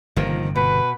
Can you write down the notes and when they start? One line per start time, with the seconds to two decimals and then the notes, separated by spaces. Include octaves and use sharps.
0.16 G1 C3 D#3 F3 A#3
0.56 B2 B4